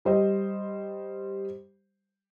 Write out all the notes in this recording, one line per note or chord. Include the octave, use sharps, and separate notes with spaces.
G3 C5 D#5